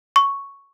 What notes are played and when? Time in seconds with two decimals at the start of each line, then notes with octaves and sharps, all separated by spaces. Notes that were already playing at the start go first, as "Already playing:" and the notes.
0.16 C#6